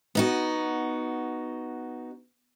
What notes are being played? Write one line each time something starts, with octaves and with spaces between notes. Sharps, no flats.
B3 D#4 F#4